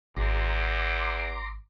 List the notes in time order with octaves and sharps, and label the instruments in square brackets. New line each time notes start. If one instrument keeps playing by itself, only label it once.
[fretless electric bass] G#1 [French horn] E2 [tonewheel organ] A#5 C6 D6